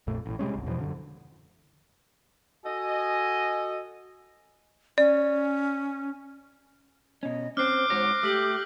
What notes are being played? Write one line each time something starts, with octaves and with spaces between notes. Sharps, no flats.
A#1 F2 A#2 A3
A1 A2
C3 G3 G#3 C#4
G1 C2
E2 B2 E3 F3
F#2 D3
F#4 A4 D#5 G#5
C#4 D5
B2 C#4 D#5
C4 C#4 C5 D6 F6 F#6 C7
G#2 F#4 C#5 A#6
A3 G4 E6 B6 F#7